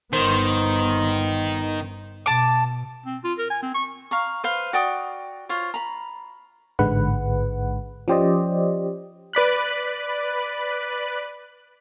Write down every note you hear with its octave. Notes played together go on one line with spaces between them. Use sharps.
G1 D#3 B3 C5
B2 A5 D6
C4
F4
A#4
G#5
C4
C#6
F5 A#5 C#6
B4 C5 F5
F#4 D5 G5 D#6
F4 C5 C#5
A#5 B5
A1 G#2 D3 G#3 B4 F#5
F3 C#4 G4 C5 D5 D#5
B4 D5 B5 F#6